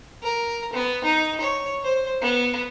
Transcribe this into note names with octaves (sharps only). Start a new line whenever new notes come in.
A#4
B3
D#4
C#5
C5
B3